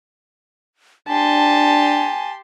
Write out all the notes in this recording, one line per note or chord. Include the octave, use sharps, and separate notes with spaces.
D4 G4 G#5 A5 C6